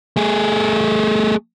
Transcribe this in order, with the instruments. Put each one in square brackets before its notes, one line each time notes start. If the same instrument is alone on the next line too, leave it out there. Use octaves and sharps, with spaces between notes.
[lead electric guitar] A3 G#4